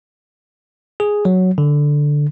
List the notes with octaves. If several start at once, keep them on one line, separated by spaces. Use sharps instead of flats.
G#4
F#3
D3